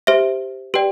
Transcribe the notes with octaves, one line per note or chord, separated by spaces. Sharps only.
G4 C5 E5
G4 B4 D5 G5